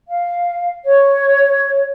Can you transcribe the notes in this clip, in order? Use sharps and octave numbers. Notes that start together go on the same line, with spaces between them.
F5
C#5